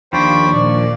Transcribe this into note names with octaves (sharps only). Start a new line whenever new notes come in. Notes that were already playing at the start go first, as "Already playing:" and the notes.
D#2 F3 D4 C5 G5 B5 C#6
A#2 D5